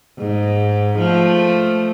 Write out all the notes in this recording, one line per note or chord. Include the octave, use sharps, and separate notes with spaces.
G#2
F3 A3